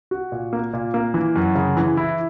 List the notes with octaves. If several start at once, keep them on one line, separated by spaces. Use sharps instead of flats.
F#4
A#2
A#3
A#2
A#3
E3
F#2
C#3
E3
E4